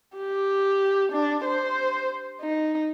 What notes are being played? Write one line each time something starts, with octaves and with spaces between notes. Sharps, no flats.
G4
D4
C5
D#4